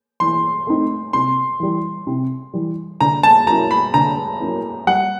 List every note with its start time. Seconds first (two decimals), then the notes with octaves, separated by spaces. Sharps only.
0.20 E3 C6
0.67 A3 C4 D#4
1.13 C3 C6
1.60 E3 G3
2.07 C3
2.53 E3 G3
3.01 D3 A#5
3.23 A5
3.46 F#3 A#3 C#4 E4 A#5
3.71 B5
3.94 D3 A#5
4.40 F#3 A#3 C#4 E4
4.87 G3 F#5